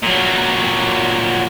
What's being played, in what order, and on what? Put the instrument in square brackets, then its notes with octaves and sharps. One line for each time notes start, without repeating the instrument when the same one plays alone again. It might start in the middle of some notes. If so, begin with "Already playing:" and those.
[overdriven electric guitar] A#2 F#3